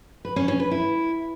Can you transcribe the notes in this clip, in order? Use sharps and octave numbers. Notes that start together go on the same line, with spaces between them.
B4
C#4
C#4
B4
E4